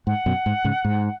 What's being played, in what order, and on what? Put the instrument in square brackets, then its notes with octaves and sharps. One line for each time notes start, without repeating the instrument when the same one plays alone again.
[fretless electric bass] G#2 [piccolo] F#5
[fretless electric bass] F#2 B2
G#2
G#2 C#3
G#2